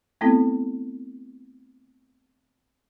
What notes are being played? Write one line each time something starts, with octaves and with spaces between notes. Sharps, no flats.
A3 B3 C4 E4 A4